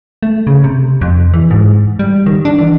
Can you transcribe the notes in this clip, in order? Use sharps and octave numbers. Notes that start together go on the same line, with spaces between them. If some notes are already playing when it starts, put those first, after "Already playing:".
A3
C#3
C3
F2
E3
G#2
G3
D#3
D4
E3